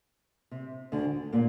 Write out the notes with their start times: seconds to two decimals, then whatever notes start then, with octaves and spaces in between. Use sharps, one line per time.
0.51 C3
0.92 D2 D3
1.33 A#2 A#3